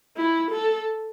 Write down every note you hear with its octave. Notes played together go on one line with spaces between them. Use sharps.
E4
A4